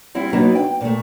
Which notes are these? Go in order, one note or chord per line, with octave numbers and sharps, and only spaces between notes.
G3 C4 E4
F#3 A#3 B3 D4 D#4 B4
G5
A#2 A3